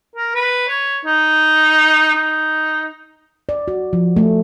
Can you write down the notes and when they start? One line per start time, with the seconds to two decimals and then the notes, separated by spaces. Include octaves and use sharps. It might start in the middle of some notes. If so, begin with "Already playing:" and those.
0.16 A#4
0.35 B4
0.68 C#5
1.05 D#4
2.15 D#4
3.49 D5
3.68 F#4
3.93 F3
4.17 A3